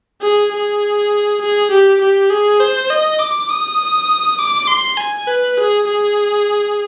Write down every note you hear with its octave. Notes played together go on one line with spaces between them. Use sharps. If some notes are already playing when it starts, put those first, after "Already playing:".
G#4
G#4
G#4
G4
G4
G#4
C5
D#5
D6
D#6
D6
C6
G#5
B4
G#4
G#4